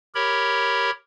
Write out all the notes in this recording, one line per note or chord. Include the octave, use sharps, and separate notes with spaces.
G4 A#4 C#5 B5